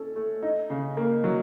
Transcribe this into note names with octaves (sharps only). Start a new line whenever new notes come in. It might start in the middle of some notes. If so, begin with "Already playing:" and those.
Already playing: C#4 A4
A3
D#4
C#3
A#3
F#3